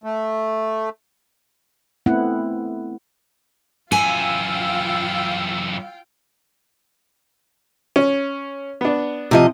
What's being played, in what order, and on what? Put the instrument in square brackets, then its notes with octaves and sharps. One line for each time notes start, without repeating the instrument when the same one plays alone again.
[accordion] A3
[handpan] A3 B3 C4 E4 F#5
[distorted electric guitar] F#2 E3 [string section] F4 F5 G5 [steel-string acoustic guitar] G#5 [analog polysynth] E6
[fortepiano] C#4
B3 D4
[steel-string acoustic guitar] C3 F3 D#5